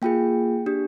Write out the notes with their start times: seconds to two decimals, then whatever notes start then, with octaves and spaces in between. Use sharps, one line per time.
0.02 A#3 F4 G#4 G5
0.66 D4 G4